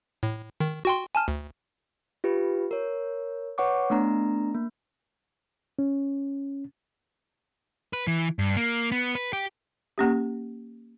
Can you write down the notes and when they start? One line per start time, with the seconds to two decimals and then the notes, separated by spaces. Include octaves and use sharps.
0.23 A2
0.60 D#3
0.85 F#4 G5 C6
1.15 G#5 A5 F6
1.28 D2
2.24 F4 G4 B4
2.71 A#4 C#5
3.58 B4 C#5 F#5 C#6 D6
3.90 A3 B3 D4 A#5
4.54 A#3
5.79 C#4
7.93 B4
8.07 E3
8.39 G2
8.56 A#3
8.92 B3
9.15 B4
9.33 G4
9.98 A#3 C#4 G4